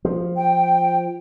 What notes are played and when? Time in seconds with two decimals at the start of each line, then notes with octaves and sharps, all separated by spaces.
0.05 F3
0.36 G5